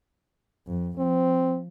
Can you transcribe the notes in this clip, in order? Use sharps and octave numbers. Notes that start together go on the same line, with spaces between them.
F2
F3 C4